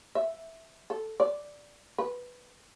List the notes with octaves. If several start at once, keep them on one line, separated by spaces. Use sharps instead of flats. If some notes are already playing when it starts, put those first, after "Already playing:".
E5
A4
D5
B4